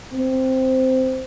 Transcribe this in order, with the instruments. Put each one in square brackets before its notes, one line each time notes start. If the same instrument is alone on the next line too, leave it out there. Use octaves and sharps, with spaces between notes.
[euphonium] C4